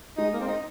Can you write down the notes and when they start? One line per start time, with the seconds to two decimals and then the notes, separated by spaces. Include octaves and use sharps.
0.17 G#3 D#4
0.33 A#3
0.40 C4
0.48 D#4